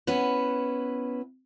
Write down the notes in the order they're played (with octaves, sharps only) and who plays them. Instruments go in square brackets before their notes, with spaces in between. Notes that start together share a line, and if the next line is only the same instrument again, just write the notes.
[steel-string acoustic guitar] B3 C#4 E4 B4